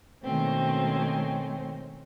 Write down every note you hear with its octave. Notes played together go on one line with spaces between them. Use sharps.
B2 D#3 G#3 A3 C4 C#4